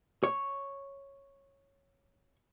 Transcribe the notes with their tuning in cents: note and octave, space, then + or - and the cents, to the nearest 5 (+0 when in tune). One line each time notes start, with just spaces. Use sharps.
C#5 -5